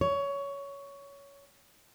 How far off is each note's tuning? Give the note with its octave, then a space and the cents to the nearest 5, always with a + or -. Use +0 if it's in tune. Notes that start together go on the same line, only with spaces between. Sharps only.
C#5 +15